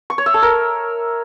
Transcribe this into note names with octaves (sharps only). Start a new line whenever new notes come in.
C#6
C#5
E5
A4
A#4